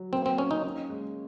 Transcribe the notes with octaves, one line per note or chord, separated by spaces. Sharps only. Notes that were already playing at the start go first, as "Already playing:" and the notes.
Already playing: F#3
A#3 C4
C4
A#3 C#4
D#4
C#4
G#3